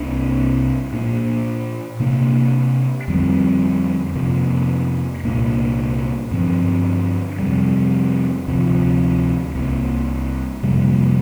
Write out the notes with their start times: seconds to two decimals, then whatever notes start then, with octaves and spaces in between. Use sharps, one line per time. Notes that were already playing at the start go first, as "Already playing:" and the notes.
Already playing: C2 C3 A#3 D4
0.93 A#2 A#3 D4
2.00 C3 A#3 D4
3.08 F2 D3 G3 C4
4.15 F2 C3 A#3
5.24 C2 A#2 A#3 D4
6.31 G2 D3 F3 C4
7.39 F2 C3 G3
8.47 D2 C3 F3
9.55 C2 C3 A#3
10.63 F2 C3 G3 A#3